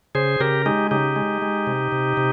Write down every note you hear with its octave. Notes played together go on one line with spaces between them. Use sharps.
C#3 G#4 C5
C#3 G4 A#4
G#3 D#4 G4
C#3 D#4 G4
G#3
G#3
C3
C3
C3